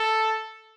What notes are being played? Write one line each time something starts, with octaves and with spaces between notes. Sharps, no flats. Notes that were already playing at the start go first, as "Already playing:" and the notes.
Already playing: A4